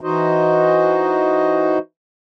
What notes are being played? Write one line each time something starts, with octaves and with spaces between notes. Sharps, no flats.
E3 D#4 F#4 C5 D#5